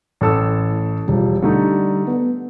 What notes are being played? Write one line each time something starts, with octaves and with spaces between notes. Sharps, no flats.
A1 A4 E6
A2
E1 F3 G3
D3 G3 A3 D#4
B3